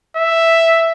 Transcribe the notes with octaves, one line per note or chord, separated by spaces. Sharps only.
E5